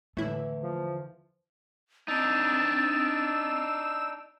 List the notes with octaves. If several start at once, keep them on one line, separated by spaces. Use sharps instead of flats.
E2 A2 D3 A3 E4
F3
C4 D4 D#4 E6 A6